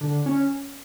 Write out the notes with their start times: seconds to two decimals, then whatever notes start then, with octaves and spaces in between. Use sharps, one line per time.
0.01 D3
0.26 C#4